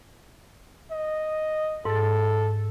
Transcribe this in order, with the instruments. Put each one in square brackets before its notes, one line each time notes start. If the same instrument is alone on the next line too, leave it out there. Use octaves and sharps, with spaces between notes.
[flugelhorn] D#5
[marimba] G#2 A6 [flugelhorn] A4